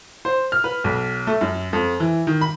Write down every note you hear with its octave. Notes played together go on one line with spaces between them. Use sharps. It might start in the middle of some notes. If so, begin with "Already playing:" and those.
C5
F6
B4
B1
A3
F#2
F2
E3
D#3
B5